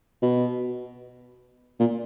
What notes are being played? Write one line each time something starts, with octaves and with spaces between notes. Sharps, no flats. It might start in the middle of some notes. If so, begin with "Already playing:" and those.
B2
A#2